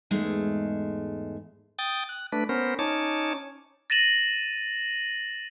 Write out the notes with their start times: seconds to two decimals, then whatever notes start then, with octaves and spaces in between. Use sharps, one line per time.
0.11 E2 G#2 G#3 A3
1.79 G5 D#6 A6
2.09 F#6
2.32 A3 D4 B4
2.49 B3 C#4 A#4 C5
2.79 C#4 D#4 C#5 A5 D6
3.90 A6 A#6 D#7 E7 F#7